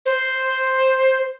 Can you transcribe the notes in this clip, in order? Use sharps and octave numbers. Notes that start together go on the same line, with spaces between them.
C5